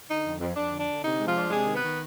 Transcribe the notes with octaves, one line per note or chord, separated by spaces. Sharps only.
D3 D#4
F2
F2
F2 D4
D3
D4
D3
C3 D#4
G#3
F3 F4
D4
C3 G#3 G#4
D#3
B3 B4
D#3